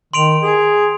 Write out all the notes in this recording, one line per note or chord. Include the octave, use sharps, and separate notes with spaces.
D#3 C6 D7 F7
G#4